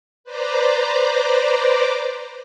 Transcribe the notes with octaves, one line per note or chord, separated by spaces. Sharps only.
B4 C5 D5 A#5 D6